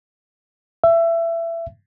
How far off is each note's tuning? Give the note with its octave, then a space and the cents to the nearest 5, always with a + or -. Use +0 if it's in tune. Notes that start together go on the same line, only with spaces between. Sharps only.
E5 +20